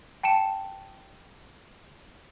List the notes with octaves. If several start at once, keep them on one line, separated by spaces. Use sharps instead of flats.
G5 A5 C#7 E7